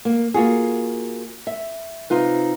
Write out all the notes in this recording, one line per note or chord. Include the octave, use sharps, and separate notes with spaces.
A#3
A#3 F4 F#4 G#4
E5
C3 D#4 F4 B4